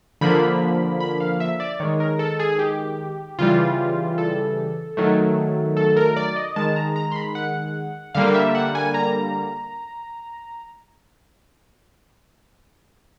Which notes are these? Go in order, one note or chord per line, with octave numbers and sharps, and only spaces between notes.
D3 F3 A#3 B5
B5
F5
E5
D5
D#3 G#3 C#5
A#4
A4
G#4
G4
C#3 E3 G3 F4
A4
D#3 F#3 A3
A4
A#4
D5
D#5
D#3 G#3 A5
A#5
A#5
C6
B5
F#5
D3 G3 A#3 F5
E5
F#5
G#5
A#5